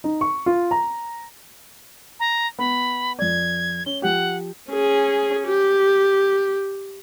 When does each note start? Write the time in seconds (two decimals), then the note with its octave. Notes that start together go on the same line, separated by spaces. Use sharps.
0.04 D#4
0.21 C#6
0.46 F4
0.71 A#5
2.20 A#5
2.59 B3 B5
3.19 F2 D5 G#6
3.86 C#4 G7
4.02 F3 G4 F#5
4.70 C#4 G#4
5.47 G4